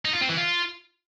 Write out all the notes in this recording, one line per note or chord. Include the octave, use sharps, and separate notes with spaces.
D#4
F4
C4
E3
F4